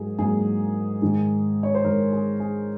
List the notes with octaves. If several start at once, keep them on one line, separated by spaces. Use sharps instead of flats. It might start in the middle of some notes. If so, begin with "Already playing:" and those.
Already playing: G#2 F#3 A#3 G#4
G#2 F#3 A#3 G#4
G#2 D#3 G#3
C#5
C5
G#2 D#3 G#3 A#4
G#4
G#4